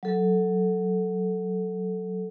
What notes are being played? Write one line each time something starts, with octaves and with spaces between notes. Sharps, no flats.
F#3 A4